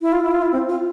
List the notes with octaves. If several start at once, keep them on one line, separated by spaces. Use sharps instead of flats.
E4
F4
E4
F4
E4
C4
F4